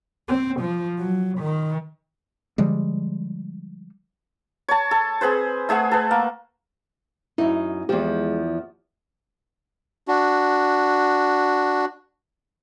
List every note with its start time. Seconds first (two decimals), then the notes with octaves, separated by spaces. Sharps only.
0.28 C4
0.60 F3
0.99 F#3
1.39 D#3
2.58 D3 F3 G3 G#3
4.68 C#5 A5
4.91 A4
5.21 C4 G#4 B4 C5
5.69 A3 G#4 E5 F#5
5.91 A4 B4
6.11 A#3
7.38 F#2 D#4 E4
7.89 E2 F3 G#3 G4
10.08 D4 F#4